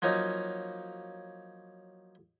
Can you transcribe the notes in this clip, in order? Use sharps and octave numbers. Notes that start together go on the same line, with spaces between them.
F3 F#3 A#3 C#4 D#4